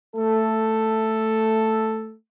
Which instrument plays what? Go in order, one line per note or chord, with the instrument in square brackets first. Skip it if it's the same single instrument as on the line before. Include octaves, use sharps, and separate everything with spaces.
[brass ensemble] A3 A4